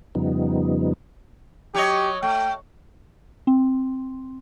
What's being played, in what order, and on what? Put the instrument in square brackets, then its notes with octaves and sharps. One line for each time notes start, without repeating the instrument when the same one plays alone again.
[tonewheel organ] F2 C#3 F3 G3 B3 D#4
[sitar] F#3 C#5 D#5 [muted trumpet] G4
[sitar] A3 [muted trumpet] G5
[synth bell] C4